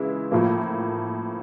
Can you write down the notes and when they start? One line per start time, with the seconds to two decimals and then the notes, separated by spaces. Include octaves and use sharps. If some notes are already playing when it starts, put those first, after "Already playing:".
Already playing: C#3 E3 G#3 E4
0.32 A2 F3 A#3